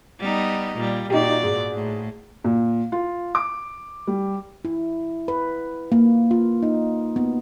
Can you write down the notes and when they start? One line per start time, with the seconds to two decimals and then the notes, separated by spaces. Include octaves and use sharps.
0.20 G3 B3 D#4
0.76 A#2 G3
1.10 A#2 D#4 F#4 G4 D5
1.43 G#2
1.74 A2
2.44 A#2
2.92 F4
3.35 D6
4.07 G3
4.65 E4
5.28 B4
5.92 A#3
6.31 F4
6.63 D#4
7.16 B3